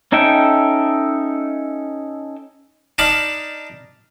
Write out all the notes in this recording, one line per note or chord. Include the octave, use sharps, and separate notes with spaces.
C#4 D#4 A4 E5 G5
D4 D#4 F5 A5 B5